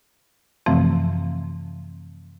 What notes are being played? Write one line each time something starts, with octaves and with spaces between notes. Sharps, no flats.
F#2 C3 E3 F3 A3 C4